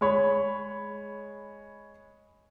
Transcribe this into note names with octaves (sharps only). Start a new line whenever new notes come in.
G#3 C#5 B5